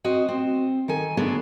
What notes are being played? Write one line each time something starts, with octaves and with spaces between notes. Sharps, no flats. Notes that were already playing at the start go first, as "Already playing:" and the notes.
C4 F#4 D#5
C4
D#3 A4 G#5
D3 B3 C#4 D4 G#4 A4